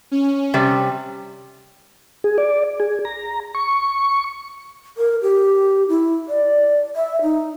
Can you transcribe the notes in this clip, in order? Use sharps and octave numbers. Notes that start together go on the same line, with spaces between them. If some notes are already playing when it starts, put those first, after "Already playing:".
C#4
C3 G3
G#4
D5
G#4
A#5
C#6
A#4
G4
E4
D5
E5
D#4